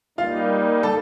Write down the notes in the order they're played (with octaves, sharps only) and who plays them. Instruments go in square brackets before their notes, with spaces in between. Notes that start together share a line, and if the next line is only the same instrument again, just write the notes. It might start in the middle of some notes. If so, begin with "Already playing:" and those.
[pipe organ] G3 A#3 D#4 [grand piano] F4 F5
[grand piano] A4 A5